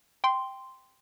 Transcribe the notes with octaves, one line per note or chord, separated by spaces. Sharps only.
G5 C6